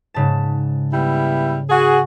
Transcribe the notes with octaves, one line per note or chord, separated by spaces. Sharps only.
G#2 C#3 A5
G3 B3 E4
F#4 G#4